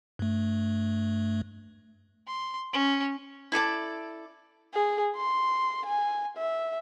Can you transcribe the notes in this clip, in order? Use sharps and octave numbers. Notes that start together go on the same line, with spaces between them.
G2 A3
C6
C#4
E4 A4 D5 A5
G#4
C6
G#5
E5